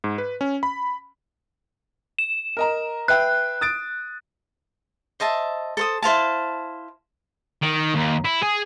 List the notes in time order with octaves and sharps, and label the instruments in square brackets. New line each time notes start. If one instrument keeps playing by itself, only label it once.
[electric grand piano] G#2
B4
C#4
B5
[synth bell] E7
[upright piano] A#4 D#5 A#5
[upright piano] B4 E5 G5 [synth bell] F#6
[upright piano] D#6 A6 D7
[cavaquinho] C5 D#5 E5 A5
A4 C5 D#6
E4 C5 F5 A5
[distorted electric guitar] D#3
D#2
E4
G#4